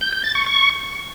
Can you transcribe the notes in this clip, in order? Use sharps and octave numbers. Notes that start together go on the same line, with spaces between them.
G6
G6
A6
C#6
C#6